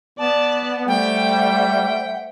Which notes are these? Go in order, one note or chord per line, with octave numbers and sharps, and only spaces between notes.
B3 D5 A5
G3 A3 C5 E5 F#5 G5